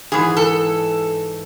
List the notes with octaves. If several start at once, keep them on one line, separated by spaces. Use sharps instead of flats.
G#2 E3 G#4
A4